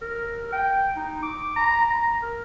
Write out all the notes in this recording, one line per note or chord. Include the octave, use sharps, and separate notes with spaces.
A#4
G5
D#4
D6
A#5
A#5
A#4